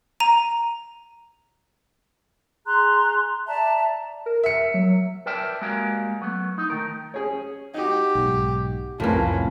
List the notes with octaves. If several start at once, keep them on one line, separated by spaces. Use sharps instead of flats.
A#5 D#7 F7
G#4 A#5 C6 F#6
D5 E5 A5 A#5
A#4
A#4 E5 C#7
F#3
A#4 B4 D5 E5 G5 A5
G3 G#3 A#3 F#4 A#4 F5
F#3 A3 B3
D#4
D#3 A3 A#4
C#4 G#4 C#5
D#4 F#4 G4
B1 G#2
C2 F2 A2 C#4 F4 A#4 B4